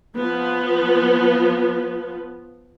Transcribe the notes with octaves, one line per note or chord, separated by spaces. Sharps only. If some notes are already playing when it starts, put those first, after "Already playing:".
F3 B3